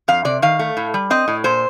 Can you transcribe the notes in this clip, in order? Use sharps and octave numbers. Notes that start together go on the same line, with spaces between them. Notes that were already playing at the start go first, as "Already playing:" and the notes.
F2 F5
C3 D5
D#3 F5
A3
A2
G3
C4 D#5
A2
A#2 C5